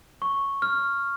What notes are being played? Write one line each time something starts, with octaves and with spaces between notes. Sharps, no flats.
C#6
F6